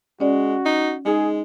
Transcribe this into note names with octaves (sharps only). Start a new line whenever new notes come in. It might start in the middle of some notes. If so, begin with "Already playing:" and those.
G#3 C#4 F#4 D5
D#4
G#3 D#4 G#4